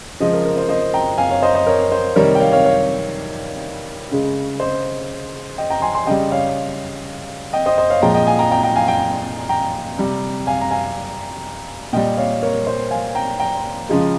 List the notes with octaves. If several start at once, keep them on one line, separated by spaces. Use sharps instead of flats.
C#3 F3 G#3 C5 D#5
A#4
A#4
C5
C5 D#5
G5 A#5
F5 G#5
C#5 F5
C5 D#5
C5 D#5
A#4 C#5
C5
C3 D#3 G3 A#4 C#5
G5
C#5 F5
C#5 F5
C#5 F5
C#3 G#3
C5 D#5
D#5 G5
G5 A#5
G#5 C6
G#5 C6
C#3 G3 D#5 G5
C#5 F5
D#5 G5
C5 D#5
C5 D#5
C#5 F5
A#2 F3 G#3 G5 A#5
D#5 G5
F5 G#5
G5 A#5
G5 A#5
G5 A#5
F5 G#5
G5 A#5
G5 A#5
C3 G3
F5 G#5
A#5
F5 G#5
A#2 G3 D#5 G5
C#5 F5
A#4 C#5
C5
F5 G#5
G5 A#5
G5 A#5
C#3 F3 G#3